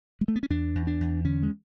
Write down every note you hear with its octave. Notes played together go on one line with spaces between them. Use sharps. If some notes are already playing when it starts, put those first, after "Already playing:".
G#3
A3
B3
C#4
E2 D4
E2
D4
E2
D3 C#4
G#3